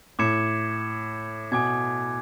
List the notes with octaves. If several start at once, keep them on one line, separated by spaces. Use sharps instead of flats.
A2 D6 G#6 C#7 E7
B2 G#5 D6 G#6